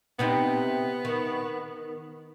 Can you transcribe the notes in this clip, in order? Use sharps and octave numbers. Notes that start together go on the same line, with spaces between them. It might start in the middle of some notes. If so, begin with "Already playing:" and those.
C3 B3 C4 D#4
D#3